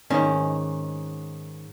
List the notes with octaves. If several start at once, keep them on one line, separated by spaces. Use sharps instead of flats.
G#2 D#3 C#4